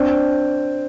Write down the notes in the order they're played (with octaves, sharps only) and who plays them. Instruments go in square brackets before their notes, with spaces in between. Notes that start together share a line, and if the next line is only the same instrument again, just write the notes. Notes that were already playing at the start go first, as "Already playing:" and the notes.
Already playing: [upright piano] C4 D4